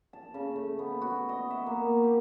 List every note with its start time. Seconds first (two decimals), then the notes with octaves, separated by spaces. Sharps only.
0.13 A5
0.34 C#3
0.56 A3
0.79 B3
1.01 F#4
1.29 D#5
1.50 E5
1.66 A#3
2.04 G4